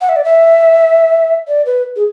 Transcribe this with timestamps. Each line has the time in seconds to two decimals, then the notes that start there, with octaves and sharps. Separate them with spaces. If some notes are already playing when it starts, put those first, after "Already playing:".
0.01 F#5
0.09 E5
0.16 D5
0.24 E5
1.48 D5
1.66 B4
1.96 G#4